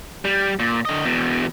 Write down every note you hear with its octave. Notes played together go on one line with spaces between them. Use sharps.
G3
A#2
D3 D#5
E2 B2